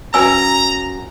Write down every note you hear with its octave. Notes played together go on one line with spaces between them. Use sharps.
F#2 C#4 B4 G#5 A#5 E6